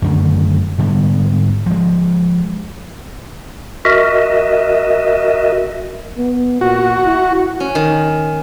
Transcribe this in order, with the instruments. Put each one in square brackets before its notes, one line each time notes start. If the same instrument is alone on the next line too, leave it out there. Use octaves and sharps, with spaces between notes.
[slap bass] F#2 D3 D#3 A3
G#2 D3 G3 B3
F3 G#3
[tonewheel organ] F#4 A#4 D#5 E5
[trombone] B3
[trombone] A#2 [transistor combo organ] F#4
[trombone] E4
[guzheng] C#4
D#3